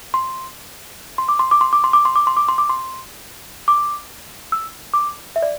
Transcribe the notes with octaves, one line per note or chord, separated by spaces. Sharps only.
C6
C6
D6
C6
D6
C6
D6
C6
D6
C6
D6
C6
D6
C6
D6
C6
D6
E6
D6
E5
D5